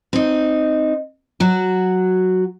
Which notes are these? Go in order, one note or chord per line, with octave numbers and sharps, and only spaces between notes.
C4 D#4
F#3 F#4